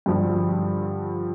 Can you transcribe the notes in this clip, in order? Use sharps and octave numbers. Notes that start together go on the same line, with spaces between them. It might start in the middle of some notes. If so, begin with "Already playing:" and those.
G2 D3 F3